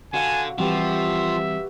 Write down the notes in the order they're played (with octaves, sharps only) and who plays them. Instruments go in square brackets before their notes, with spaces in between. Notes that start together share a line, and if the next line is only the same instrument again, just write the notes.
[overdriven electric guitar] D3 [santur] F#4 F5 F#5 [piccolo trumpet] G#5
[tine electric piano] E3 G3 C4 [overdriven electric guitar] F3 [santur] F#4 G4 B4 [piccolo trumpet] E5